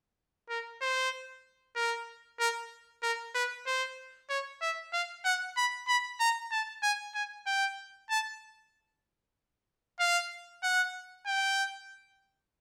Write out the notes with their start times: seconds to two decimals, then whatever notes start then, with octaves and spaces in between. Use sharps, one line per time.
0.50 A#4
0.81 C5
1.76 A#4
2.40 A#4
3.03 A#4
3.35 B4
3.67 C5
4.30 C#5
4.62 E5
4.93 F5
5.25 F#5
5.57 B5
5.88 B5
6.20 A#5
6.52 A5
6.83 G#5
7.15 G#5
7.47 G5
8.10 A5
10.00 F5
10.63 F#5
11.26 G5